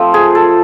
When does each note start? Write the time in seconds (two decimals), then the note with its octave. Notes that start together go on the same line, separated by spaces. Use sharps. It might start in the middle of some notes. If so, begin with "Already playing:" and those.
Already playing: F3 A3 C4 F4 C5
0.14 G#4
0.35 A4